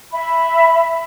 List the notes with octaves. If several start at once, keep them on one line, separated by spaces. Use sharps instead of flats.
E5 B5